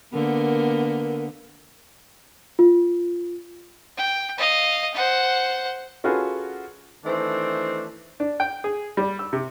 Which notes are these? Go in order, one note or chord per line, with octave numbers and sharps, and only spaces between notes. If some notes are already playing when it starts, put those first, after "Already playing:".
D3 A#3 B3 A#4
F4
G5
D#5 F5
C5 F#5
C#4 F4 F#4 G#4 A4 B4
D#3 E3 A3 C4 D4
D4
G5
G#4
G3
E6
C3